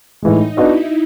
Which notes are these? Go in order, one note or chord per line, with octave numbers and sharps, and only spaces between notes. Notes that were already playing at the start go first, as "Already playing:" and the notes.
A2 E3 G#3 D#4
B3 D4 E4 F#4 B4 D#5